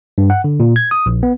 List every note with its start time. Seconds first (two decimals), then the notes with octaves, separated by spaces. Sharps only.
0.18 G2
0.30 F#5
0.44 D3
0.60 A#2
0.76 G#6
0.91 D#6
1.06 A#1
1.23 B3